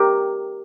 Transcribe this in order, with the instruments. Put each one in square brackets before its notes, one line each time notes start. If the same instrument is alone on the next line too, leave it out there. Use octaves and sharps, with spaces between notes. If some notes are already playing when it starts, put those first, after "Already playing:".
Already playing: [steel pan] G4 A#4